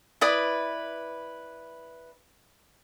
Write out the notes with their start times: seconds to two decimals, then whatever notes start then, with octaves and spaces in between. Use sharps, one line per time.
0.21 E4 B4 D5 D#6